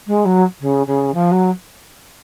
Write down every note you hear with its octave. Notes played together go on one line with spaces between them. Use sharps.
G#3
F#3
C#3
C#3
F3
F#3